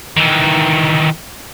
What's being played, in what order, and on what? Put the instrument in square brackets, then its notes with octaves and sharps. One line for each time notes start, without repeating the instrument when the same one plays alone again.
[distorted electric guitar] D#3 E3